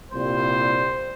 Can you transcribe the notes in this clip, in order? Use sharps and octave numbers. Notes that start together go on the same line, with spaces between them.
C2 A#2 G3 C5